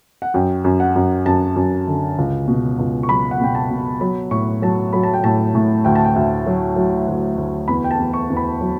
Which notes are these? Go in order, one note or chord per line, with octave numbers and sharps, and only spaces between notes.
F#5
F#2 G5
F#2
F#5
F#2
F#2 A5
F#2
D3
C#2
B2
C#2
C#6
F#3 B5
F#5
B2 G5
A5
B2
F#3 B5
A2 C#6
F#3 A5
F#3 B5
A5
G5
A2 A5
A2
D2 G5
A5
G5
D2
F#3
F#3
D2
D2
E2 B5
G5
A5
E2
C#6
E2
B5
F#3